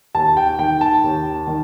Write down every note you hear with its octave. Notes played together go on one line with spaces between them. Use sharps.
D#2 A5
G5
D#3 G5
A5
D#2
D#3